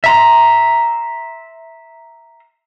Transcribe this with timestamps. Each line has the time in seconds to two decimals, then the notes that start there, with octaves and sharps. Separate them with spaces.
0.04 E5 A#5 C6